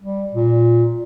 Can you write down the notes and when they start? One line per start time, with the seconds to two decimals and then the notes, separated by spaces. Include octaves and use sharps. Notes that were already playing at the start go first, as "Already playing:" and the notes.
0.02 G3
0.33 A#2